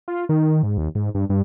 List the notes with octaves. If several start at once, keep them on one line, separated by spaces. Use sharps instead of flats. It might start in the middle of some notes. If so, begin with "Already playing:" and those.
F4
D#3
G#2
D#2
G#2
G2
G2